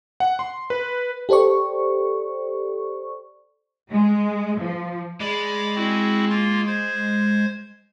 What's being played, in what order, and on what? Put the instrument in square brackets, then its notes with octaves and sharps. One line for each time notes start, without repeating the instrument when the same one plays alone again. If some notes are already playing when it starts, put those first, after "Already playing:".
[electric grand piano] F#5
C6
B4
[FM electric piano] G4 A4 C5 D5 C#6
[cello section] G#3
F3
[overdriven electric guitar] G#3 [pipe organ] D5 B5 D6
[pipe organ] C4 E4 F#4
A#3 F4 C6
C5 G#6